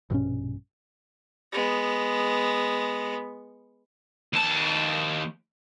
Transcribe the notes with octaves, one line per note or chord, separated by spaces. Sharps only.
A#1 G2 B2 C#4
G#3 B3
D#2 A5